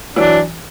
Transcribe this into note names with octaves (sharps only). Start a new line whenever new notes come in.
E3 F#3 D4